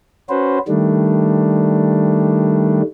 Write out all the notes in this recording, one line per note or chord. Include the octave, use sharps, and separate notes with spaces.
C#4 F#4 B4 C5
D#3 G3 A3 D4